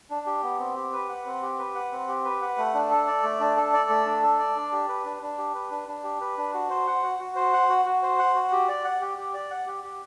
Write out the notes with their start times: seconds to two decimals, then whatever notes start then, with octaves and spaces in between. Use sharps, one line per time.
0.10 D4
0.27 G4
0.43 B3
0.59 C4
0.76 G4
0.93 B4
1.09 F#5
1.26 C4
1.42 G4
1.59 B4
1.75 F#5
1.92 C4
2.08 G4
2.25 B4
2.41 F#5
2.58 A3
2.74 D4
2.90 A4
3.07 D5
3.23 A3
3.40 D4
3.57 A4
3.73 D5
3.89 A3
4.06 D4
4.23 A4
4.39 D5
4.56 D4
4.72 G4
4.88 B4
5.05 D4
5.22 D4
5.38 G4
5.55 B4
5.71 D4
5.88 D4
6.04 G4
6.21 B4
6.38 D4
6.54 F#4
6.70 C5
6.87 F#5
7.03 F#4
7.19 F#4
7.36 C5
7.53 F#5
7.69 F#4
7.85 F#4
8.03 C5
8.19 F#5
8.35 F#4
8.52 G4
8.68 D5
8.85 F#5
9.01 G4
9.18 G4
9.34 D5
9.51 F#5
9.67 G4
9.84 G4